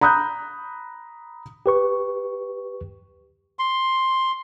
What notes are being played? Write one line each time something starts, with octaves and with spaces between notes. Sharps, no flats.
A#5 B5 D#6 F#6 G6
G4 B4 C#6
C6